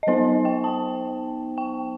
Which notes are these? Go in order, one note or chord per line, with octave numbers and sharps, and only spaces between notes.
D#5
F#3 B3 D#4 C5
G5
A5
G5